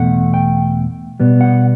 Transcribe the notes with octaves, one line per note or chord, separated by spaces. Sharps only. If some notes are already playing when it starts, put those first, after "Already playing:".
Already playing: E2 B2 A3 F#5
G5
B2 G3 B3
F#5